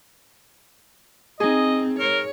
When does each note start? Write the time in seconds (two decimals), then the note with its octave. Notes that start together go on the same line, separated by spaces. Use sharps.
1.40 C4 D#4 G#4 D#5
2.00 A#4 C#5